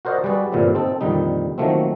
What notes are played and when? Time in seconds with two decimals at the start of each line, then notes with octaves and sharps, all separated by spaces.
0.05 F#4 A#4 C5 D5 D#5 F#5
0.24 G3 F#4 G#4 B4 D5
0.52 G2 A#2 D3 E3 G3 C4
0.75 C4 D#4 A4
1.01 F2 A#2 D3 D#3 G3 D#4
1.58 D#3 F3 F#3 A3 A#3 C4